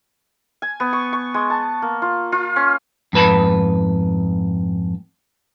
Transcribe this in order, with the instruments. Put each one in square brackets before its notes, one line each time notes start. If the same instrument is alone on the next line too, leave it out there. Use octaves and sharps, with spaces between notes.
[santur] G#5
B3
C#6
C#6
G#3
A5
A#3
F4
F4
C#4
[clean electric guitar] F2 G#2 B4 A5 B5